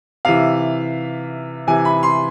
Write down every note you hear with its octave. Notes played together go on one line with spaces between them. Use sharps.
C3 E3 F5
C3 E3 G#5
B5
C6